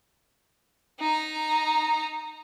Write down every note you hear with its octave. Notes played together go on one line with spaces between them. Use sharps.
D#4 A#5